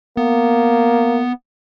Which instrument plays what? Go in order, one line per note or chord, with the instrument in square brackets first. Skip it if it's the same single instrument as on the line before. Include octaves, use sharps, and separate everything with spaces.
[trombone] A#3 [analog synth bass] B3